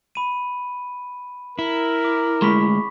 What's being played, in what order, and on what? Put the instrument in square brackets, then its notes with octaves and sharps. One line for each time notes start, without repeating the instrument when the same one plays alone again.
[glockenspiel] B5 D#7
[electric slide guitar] E4 [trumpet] A#4
[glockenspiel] D6
[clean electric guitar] D2 G#3 [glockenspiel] B5 C#6 B6